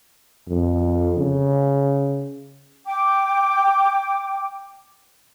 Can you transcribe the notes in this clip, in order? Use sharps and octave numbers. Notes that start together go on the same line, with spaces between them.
F2
C#3
G5 D6